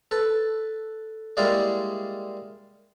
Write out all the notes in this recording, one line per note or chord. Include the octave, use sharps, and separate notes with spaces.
A4 B4
G3 G#3 A#3 E4 G#4 D5